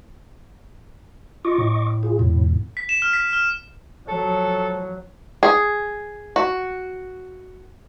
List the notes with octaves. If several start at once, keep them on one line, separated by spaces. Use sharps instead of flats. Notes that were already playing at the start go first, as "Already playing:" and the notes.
F4 D#5 C#6 D6
A2
F4 G#4
E2 G#2 B2
B6
E7
F6
B6
F6
F3 F#3 A4
G#4
F#4